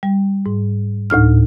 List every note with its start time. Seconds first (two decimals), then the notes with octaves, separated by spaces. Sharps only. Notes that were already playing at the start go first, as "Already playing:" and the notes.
0.03 G3
0.46 G#2
1.10 D2 A2 D#4 F6